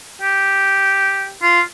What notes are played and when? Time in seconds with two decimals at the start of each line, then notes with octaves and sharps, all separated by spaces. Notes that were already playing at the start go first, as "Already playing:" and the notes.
0.22 G4
1.42 F4